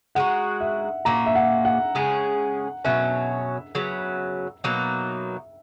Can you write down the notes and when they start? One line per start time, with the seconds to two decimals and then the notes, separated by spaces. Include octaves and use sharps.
0.15 G#3 D#4 F#4 F#5
0.61 E5
1.05 A#2 A#3 C#4 A#5
1.26 E5
1.35 F#5
1.65 F#5
1.95 C#3 G#3 C#4 G#4
2.84 B2 F#3 C#4 E5
3.75 C#3 F#3 B3
4.64 B2 F#3 A#3 D#4